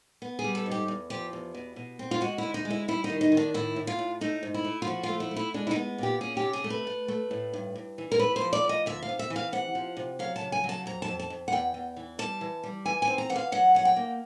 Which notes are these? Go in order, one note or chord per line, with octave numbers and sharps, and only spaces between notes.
B3
G#4
G3
A4
G#2
G4
E2
F3 G4
E2
B2
B2
C4
F4
G#3 F#4
D2 E4
D#4
G#3
E4
G3 E4
D#4
D#3
D#4
D#3
D4
A2 E4
A2
F4
A2
A3 D#4
G#2
E4
A3
F4
F3 F#4
F4
A3
E4
A3
E4
G#3 D4
E4
D#4
B3
A#2 G4
C#4 G#4
G4
C3
G#4
A3
B4
A3
A3
A2
G2
G2
E3
A#4
A3 B4
C5
F3
D5
F3
D#5
D2 E5
F5
C3
E5
E3
F5
C3 F#5
F3
C3
F#3 F5
A5
C#3
G#5
F#3
A5
F2 A#5
A5
F2
A5
F2
F#5
E2 G5
E2
E3
G3 A5
E3
G3
E3 G#5
G#5
C4
A#5
E3 F#5
F5
F#3 F#5
F#3 F#5
G5
A#3